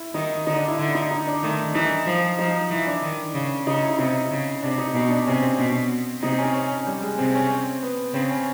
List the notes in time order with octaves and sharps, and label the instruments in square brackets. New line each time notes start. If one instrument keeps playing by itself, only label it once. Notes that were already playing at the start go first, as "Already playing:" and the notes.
Already playing: [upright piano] E4
[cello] D#3 [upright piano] D#4
[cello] D3 [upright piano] D#4
[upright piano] D4
E4
[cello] D3 [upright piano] E4
[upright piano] D#4
D#4
D4
[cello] D#3 [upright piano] A3
[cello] E3 [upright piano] D#4
[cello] F3
[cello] F3 [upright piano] D#4
[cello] E3 [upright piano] E4
[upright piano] D4
[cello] D#3
C#3
[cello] C#3 [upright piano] D#4
[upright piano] E4
[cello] C3 [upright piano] D#4
[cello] C#3
[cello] C3 [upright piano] D4
[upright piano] D#4
[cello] B2 [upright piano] D#4
[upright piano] D4
[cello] C3 [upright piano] C#4
[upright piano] C4
[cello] B2
[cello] C3 [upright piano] D#4
[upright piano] C#4
C#4
C#4
G3
G#3
[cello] C3 [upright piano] C4
[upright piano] C#4
C4
B3
[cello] C#3 [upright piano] C4
[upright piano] C#4